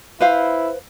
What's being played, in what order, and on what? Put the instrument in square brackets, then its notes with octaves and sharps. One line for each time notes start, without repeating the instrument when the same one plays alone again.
[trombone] E4 [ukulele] B4 C5 F5